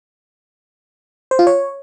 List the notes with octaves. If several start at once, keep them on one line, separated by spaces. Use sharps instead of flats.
C5
F4
C#5